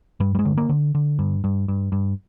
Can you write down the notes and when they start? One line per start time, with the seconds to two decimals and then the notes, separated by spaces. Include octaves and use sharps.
0.20 G2 G3
0.35 G3
0.39 G#3
0.45 D3
0.57 A#3
0.69 D3
0.95 D3
1.19 G2
1.44 G2
1.68 G2
1.92 G2